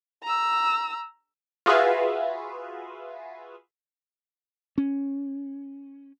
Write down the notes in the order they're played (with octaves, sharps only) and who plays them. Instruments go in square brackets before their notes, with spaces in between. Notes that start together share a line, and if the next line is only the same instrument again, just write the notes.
[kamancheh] A#5 E6
[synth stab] F4 F#4 G#4 B4 E5 F5
[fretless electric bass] C#4